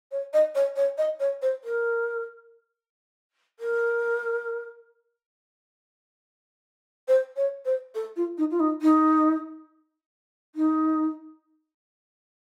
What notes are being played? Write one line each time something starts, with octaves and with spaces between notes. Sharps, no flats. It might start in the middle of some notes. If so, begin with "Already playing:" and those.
C#5
D#5
C#5
C#5
D#5
C#5
C5
A#4
A#4
C5
C#5
C5
A4
F4
D#4
F4
D#4
D#4
D#4